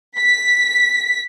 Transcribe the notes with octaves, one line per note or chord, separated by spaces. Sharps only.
B6